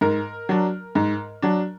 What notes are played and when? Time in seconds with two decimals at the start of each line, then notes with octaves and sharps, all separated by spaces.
0.01 G#2 A#4
0.49 F#3 D4
0.95 G#2
1.42 F#3 D4